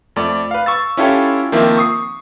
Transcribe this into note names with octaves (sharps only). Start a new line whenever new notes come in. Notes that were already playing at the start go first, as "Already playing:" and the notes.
F2 A3 D5
B4 F5
C#6 E6 A6
C#4 E4 F4 G4 A4 C#5
D#3 F3 A#3 C4 E5
C#6 D#6 C7